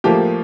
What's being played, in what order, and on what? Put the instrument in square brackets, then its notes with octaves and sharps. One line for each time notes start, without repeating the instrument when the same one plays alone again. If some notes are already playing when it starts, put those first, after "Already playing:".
[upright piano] A2 F3 A#3 G4